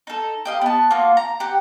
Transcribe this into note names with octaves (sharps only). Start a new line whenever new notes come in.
D#4 A4
G4 D#5 F5
B3 A5
A#3 F4 F#4
A#5
G4 F#5